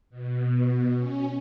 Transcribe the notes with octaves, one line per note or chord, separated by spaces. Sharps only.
B2
C#4